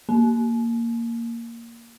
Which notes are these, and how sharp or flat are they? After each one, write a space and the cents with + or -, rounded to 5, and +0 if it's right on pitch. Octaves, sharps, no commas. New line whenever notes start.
A#3 -5